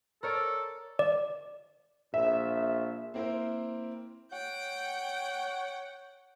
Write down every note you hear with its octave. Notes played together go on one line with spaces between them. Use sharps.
A4 A#4 C#5 D5
D5
A#1 E5
A#3 C4 E4 A#4 C5 E5
C#5 F#5 G5